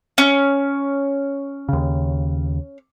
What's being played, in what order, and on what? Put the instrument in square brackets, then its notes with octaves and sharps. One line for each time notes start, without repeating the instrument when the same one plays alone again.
[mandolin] C#4
[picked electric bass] D#2 C#3